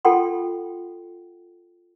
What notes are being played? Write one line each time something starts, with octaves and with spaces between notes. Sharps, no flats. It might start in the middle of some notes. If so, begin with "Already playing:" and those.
F4 A4 F#5 G5 C6